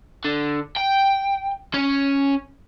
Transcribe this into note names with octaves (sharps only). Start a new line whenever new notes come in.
D3
G5
C#4